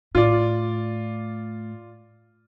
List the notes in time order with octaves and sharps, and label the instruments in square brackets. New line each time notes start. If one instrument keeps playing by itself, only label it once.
[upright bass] A2 [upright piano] F4 D5